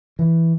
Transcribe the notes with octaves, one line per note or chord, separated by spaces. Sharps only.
E3